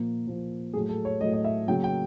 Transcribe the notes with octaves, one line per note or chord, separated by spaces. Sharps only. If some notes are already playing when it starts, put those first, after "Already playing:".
Already playing: A#2 F3 A#3
A#2 F3 A#3
A2 F#3 A3 G#4
A4
C#5
A2 F#3 A3 D#5
D#5
E5
C#3 F#3 A#3 G5
G5